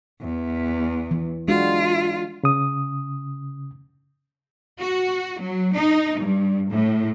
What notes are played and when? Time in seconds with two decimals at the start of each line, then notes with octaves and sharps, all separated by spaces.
0.21 E2
1.11 E3
1.48 G#3 D4 F4 F#4
2.43 C#3 D#6
4.80 F#4
5.41 F#3
5.76 D#4
6.19 G2
6.72 A2